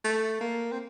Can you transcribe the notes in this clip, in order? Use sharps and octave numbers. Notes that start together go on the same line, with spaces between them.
A3
A#3
C4